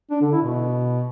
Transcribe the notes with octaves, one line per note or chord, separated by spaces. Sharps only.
D4
D3
E4
B2